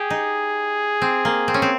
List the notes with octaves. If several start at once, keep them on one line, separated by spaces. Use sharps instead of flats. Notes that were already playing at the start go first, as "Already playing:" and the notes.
Already playing: G4 G#4
D#4
C4
A#3
C4
C#4
C4